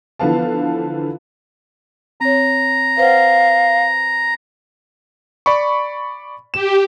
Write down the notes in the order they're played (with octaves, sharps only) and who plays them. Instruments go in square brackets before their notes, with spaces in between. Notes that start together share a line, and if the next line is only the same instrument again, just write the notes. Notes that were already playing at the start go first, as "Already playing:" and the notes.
[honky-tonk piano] D3 E3 F3 B3 F5 A5
[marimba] C4 C#5 [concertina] A#5
[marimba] B4 C5 F#5 [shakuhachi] F5
[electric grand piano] D5 B5 C#6
[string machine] G4 [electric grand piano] E7